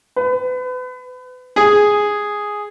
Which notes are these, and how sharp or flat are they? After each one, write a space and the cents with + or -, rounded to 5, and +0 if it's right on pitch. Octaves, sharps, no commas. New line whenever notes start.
B4 +35
G#4 +0